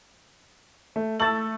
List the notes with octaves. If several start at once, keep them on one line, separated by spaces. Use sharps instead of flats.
A3
A3 E6 A6 F#7